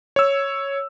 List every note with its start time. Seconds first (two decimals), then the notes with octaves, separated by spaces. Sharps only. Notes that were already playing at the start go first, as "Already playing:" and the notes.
0.16 C#5 E6